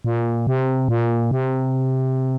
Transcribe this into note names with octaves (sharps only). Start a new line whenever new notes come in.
A#2
C3
A#2
C3